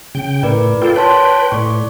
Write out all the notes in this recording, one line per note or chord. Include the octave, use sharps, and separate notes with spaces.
C#3 G5
A2 A#4 B4 D5
F4 A4 G5
B4 C#5 G5 A5 C6
A2 D5 C#6